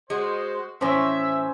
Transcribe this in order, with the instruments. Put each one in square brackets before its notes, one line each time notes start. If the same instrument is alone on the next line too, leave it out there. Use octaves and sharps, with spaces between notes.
[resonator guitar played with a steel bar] G#3 [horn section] F#4 C5
[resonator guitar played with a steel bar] A2 E3 [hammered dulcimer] C#4 C5 [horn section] E5